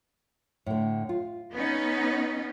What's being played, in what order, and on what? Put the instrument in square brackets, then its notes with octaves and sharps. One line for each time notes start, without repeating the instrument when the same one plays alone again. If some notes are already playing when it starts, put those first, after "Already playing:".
[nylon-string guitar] A2 D3
F4
[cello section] B3 C#4 D#4